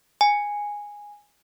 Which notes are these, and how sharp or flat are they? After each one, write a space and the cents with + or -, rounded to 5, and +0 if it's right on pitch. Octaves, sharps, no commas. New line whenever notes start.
G#5 -10